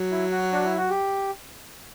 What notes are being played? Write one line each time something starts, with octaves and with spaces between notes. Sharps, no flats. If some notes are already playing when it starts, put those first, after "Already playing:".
Already playing: F#3
E4
F#4
D4
E4
F#4
G4